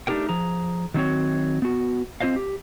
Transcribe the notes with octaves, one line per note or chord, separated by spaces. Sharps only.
A3 D4 D#4 G4 A#4 G5
F3 G#4 A#5
D#3 F#3 A3 C4 F#4 C#5
B3 F#4
C4 F4 C5 D#5 F5
G4